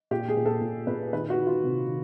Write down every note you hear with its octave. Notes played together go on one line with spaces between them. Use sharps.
A#2 G4
G#4
A#2
A4
A#2
A#2 B4
D#3 B4
F#4
D#3
F4
C3
D#3